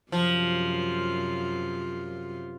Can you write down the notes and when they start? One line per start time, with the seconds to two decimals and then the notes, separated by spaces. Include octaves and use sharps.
0.12 F#2 C3 F3 F4